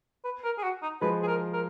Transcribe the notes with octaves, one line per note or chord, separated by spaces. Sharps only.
B4
A#4
G#4
F#4
D#4
F3 G#3 B4
G#4
A#4
A#4